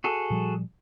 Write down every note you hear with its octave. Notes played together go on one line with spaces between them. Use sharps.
F#4 G#4 A4
A#2 F3 G3